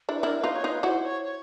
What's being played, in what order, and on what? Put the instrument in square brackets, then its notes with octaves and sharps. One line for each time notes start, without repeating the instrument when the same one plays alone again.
[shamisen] D4 E4
[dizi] B4
[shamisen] D4 E4 [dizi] A#4
[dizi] B4
[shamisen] D#4 F4
[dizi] C#5
[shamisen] D#4 F4 [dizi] B4
[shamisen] E4 F#4 [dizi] C5
[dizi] C#5
C#5